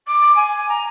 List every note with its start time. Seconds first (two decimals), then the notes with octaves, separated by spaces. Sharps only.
0.07 D6
0.35 G#5
0.68 A#5